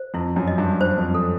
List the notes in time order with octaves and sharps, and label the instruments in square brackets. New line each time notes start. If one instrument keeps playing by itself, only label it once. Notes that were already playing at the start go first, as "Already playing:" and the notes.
Already playing: [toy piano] C5
[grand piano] F2 [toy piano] E4
[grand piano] F#2
[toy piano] D#5
[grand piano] G2
[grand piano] G2 [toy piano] C5
[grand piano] F2
[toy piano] A4